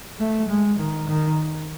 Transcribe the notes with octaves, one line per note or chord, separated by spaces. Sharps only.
A3
G#3
D#3
D#3